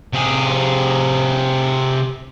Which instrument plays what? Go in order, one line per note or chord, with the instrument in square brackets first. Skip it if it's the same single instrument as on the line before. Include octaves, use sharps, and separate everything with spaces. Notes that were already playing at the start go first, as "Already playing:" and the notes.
[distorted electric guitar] C3 G#4